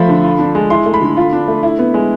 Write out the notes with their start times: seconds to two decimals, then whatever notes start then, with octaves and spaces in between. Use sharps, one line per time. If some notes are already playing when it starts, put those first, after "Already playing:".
Already playing: F3 A3 B5
0.09 D3
0.24 F4
0.39 D4
0.55 G#3
0.70 E4 C6
0.86 A3
0.94 B5
1.01 D3
1.17 F4
1.33 D4
1.48 A3
1.63 E4
1.79 B3
1.94 G#3